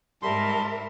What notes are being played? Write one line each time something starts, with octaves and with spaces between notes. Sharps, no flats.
G#2 G3 A#4 E5 A5 C6